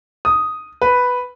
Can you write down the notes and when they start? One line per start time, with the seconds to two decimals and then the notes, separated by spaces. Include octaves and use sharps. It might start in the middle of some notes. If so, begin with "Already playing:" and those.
0.25 D#6
0.81 B4